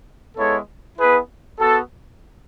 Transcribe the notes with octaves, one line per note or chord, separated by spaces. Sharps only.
G#3 B3 E4 A4 C#5
B3 E4 G#4 B4
B3 F#4 A4